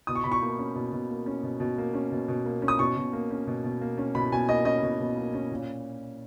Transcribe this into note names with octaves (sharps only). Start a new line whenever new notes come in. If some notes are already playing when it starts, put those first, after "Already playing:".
B2 D#6
C#6
B2 B5
C#6
A#3
C#4
B2
B2
A#3
C#4
B2
B2
A#3
C#4
B2
B2
A#3
C#4
D#6
B2 C#6
B2
A#3
C#4
B2
B2
A#3
C#4
B2 B5
B2 G#5
A#3 D#5
C#4 D#5
B2
B2
A#3
C#4
A#2